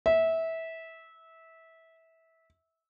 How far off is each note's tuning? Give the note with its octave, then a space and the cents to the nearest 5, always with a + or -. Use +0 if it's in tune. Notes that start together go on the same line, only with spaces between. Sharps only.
E5 -20